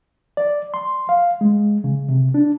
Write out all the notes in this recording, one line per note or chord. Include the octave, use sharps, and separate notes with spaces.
D5
C6
F5
G#3
C#3
C3
D4